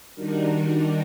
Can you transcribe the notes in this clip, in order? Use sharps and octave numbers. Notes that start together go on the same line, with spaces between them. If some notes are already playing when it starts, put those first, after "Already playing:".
D#3 G3 D4 D#4 F#4 A#4